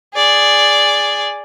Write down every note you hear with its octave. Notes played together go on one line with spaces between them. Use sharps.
G#4 D5